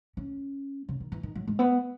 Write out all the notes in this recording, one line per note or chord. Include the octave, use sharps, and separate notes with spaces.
C#4
C#3
D#3
E3
D#3
F#3
G#3
B3